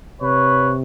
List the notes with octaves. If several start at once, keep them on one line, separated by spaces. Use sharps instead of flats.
C3 B4 C#5